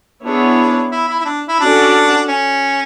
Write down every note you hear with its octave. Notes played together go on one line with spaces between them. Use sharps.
B3 D4 E4 G#4 C#5
E4
E4
E4
D4
E4
C#4 D4 F#4 A4 D5
C#4